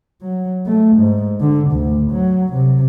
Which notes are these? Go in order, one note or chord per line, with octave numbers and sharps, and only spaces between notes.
F#3
A3
G#2
D3
D2
F#3
C3